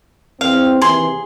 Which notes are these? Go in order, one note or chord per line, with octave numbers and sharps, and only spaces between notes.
E2 C4 F5
D#2 C3 E3 G#4 C6